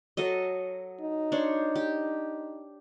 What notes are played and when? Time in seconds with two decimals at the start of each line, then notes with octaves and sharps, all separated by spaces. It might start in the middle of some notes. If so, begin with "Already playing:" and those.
0.17 F#3 A4 D#5
1.01 D#4
1.32 D4 C5 C#5
1.75 G4